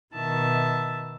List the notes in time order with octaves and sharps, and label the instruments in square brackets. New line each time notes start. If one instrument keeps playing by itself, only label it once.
[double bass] B2 D#3 [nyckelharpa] E5 A5